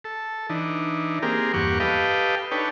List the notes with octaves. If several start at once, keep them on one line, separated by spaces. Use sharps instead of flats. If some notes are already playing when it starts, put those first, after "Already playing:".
A4
E3 D4 D#4
A#3 C4 G4 G#4 A#4
E2 G2 A#3 G4 F#5 C#6
G4 A4 B4 D#5 F5 G5
D4 D#4 A4 B4 C#5 G5